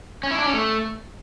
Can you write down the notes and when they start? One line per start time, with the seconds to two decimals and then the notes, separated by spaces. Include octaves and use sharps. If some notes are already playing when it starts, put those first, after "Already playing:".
0.23 C#4
0.31 E4
0.38 D4
0.46 C#4
0.53 A3